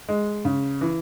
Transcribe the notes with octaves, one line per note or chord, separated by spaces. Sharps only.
G#3
C#3
E3